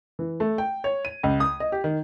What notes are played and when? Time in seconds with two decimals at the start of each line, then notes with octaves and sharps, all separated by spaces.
0.19 E3
0.40 A3
0.58 G5
0.84 C#5
1.05 D#7
1.23 C#2
1.40 D#6
1.60 D#5
1.72 G4
1.84 D#3